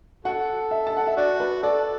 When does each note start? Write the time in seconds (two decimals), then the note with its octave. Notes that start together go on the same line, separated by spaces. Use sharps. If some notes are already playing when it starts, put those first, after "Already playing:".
0.25 F#4 A4 F#5
0.71 E5
0.87 A5
0.97 F#5
1.07 E5
1.17 D4 F#4 D5
1.40 B4
1.63 A4 D5